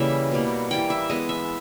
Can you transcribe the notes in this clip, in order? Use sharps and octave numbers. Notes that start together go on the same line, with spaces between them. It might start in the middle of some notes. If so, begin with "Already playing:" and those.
Already playing: C#3 E3 G3 A#3 E5 G5
B2 G3 A#3
E3 G3 A#3 G5
E5
E3 G#3 B3 D#5
E5